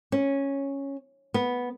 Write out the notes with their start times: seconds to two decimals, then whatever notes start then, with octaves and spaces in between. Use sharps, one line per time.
0.12 C#4
1.34 B3